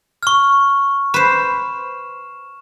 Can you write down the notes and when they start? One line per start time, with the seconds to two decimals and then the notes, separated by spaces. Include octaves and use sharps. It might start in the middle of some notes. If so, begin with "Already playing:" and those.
0.23 C#6 F6
1.14 B4 C5 E7